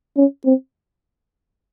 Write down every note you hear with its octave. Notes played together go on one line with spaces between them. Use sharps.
C#4
C4